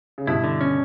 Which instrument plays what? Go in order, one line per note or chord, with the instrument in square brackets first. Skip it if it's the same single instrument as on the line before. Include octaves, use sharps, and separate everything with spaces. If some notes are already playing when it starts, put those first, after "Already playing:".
[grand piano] C#3
[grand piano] G2 B2 [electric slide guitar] E4
[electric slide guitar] D3
C#4